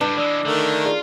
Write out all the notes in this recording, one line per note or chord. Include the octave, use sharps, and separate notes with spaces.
A2 G3 D4 B4
E3 G#3 D5 D#6 E6
D3 D#3 A3 A#4
F4 G#4 D5